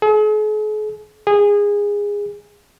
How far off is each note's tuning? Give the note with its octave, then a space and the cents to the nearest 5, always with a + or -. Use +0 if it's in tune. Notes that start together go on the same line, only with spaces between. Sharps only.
G#4 +45
G#4 -20